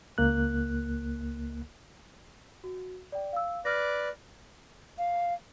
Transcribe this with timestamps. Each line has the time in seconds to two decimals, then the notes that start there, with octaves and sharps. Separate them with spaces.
0.18 C#2 A#3 F#6
2.64 F#4
3.12 D5 G5
3.33 F5 E6
3.65 B4 D5 F6 A#6
4.98 F5